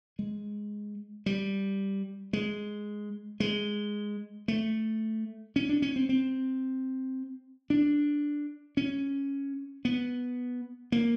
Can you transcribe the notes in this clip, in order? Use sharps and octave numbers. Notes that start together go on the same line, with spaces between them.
G#3
G3
G#3
G#3
A3
C#4
D4
C#4
C4
C4
D4
C#4
B3
A#3